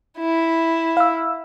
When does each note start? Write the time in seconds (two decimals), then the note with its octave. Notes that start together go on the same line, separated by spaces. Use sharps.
0.18 E4
0.97 F5 E6